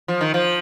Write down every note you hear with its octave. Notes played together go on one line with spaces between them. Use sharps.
F3
D#3
F3